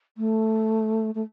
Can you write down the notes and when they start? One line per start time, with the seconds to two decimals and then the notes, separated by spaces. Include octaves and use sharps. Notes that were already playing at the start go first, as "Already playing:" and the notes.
0.18 A3
1.15 A3